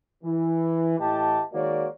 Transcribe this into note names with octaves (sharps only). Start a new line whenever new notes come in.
E3
A2 E3 G4 D#5 A5
D#3 G#3 A#3 F#4 C#5 D5